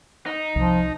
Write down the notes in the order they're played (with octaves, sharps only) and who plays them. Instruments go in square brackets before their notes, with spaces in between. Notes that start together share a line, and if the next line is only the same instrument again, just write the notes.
[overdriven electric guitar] D#4
[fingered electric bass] C2 [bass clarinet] F3